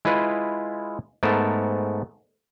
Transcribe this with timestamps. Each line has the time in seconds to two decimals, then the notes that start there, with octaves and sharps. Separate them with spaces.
0.05 G#3 E4 F4 B4 D#5
1.23 G#2 A3 B3 A#4 A5